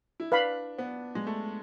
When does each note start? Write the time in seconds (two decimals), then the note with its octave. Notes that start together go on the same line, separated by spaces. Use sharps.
0.20 E4
0.32 D4 B4 F5 B5
0.78 B3
1.15 G#3
1.27 A3